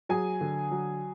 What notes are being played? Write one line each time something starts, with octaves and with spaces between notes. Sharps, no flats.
F#3 G#4 G#5
D3
F#3